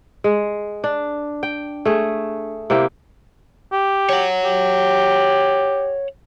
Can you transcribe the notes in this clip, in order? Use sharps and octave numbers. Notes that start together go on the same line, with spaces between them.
G#3
D4
G5
A3 G#4
C3 A#3 E4 G4
G4
C#5 F#5
G4